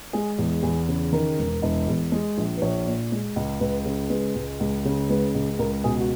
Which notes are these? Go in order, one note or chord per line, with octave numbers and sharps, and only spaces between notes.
G#3 G#4
E2
E2 G#4
C#3
D#3 A#4
E1
E1
E2
G#3
A#1
B4
A#1 C#5
A#2
G#3
C#2
C#2 B4
C#3
G#3 B4
C#2
C#2
C#3
G#3 B4
C#2
C#2 A#4
B2 G#4
F#4